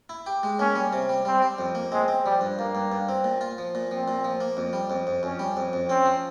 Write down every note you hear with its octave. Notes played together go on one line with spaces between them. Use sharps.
E4
G4
G#3
A#3 C#4
G3
C3
G3
G3 C4
G3
F2
A#3
G#3 C4
C4
F3 G3
G2
G2 A#3
G2
G2
C4
A#2
F4
F3
A#2
F3 C4
A#2
F3
A#3
F2
G3
F2
F2
F2 C#4
G3
F2
F2
C4 C#4
F3